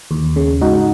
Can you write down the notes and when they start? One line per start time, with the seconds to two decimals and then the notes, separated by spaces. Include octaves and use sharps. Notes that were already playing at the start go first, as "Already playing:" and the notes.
0.11 D#2
0.36 C#3
0.62 G#2 D#4 F#4